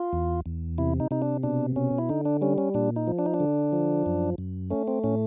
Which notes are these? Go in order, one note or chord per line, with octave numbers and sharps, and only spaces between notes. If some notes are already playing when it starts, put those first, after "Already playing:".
Already playing: F4
E2
E2
C3 E4
D#4
C3 D#4
D4
B2 D4
B2 C#4
E4
D3 D#4
D4
G3 C#4
C#4
A#2 D4
D#4
F3
D4
D#4
D4
D3
F3
F#2
F#2
A3 C#4
C4
A2 C#4